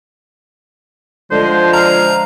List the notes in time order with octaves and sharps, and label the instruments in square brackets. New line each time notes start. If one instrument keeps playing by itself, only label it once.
[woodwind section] D3 G#3 [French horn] F3 [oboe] C5
[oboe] F5 [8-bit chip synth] A#5